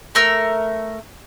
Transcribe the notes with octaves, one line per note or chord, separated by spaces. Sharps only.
A3 A#4 E6